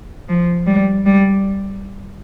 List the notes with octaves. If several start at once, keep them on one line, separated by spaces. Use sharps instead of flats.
F3
G3
G3